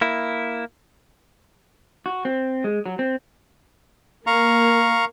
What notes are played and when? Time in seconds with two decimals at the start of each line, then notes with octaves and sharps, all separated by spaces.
0.01 A#3 E4
2.06 F#4
2.25 C4
2.64 G#3
2.86 F#3
2.99 C4
4.27 A#3 F5 A#5 C#6